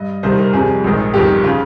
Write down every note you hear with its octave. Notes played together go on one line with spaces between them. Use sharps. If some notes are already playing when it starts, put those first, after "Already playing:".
Already playing: G2 D#5
C2 C3 D#3 G3 C5
A#4
F2 C3 G3 G#4
A#1 G#2 D#3
G1 F2 D#3 G4
C#3 F4